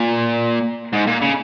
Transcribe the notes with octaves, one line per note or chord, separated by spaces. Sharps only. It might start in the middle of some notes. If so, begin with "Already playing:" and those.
Already playing: A#2
G#2
A#2
C#3